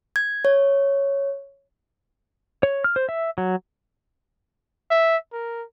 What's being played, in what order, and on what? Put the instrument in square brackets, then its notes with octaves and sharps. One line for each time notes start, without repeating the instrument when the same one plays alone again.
[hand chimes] G#6
C#5
[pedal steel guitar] C#5
F6
C5
E5
F#3
[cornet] E5
A#4